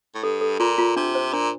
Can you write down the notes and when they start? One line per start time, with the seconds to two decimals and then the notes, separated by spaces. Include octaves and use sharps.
0.15 A2
0.23 G2 A4
0.41 A4
0.60 A#2 F4
0.78 F4
0.96 C3 D4
1.15 C5
1.33 A#2 D4